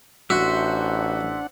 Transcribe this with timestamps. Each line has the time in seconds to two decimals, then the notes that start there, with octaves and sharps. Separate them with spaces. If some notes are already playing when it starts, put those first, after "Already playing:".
0.30 A1 D4 F#4 C5 E5 F#5